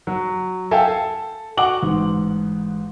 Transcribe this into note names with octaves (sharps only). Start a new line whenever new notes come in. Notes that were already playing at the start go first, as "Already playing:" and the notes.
F#3
A4 E5 F5 G5 G#5
A4
F#4 F#5 D6 F#7
A1 G#2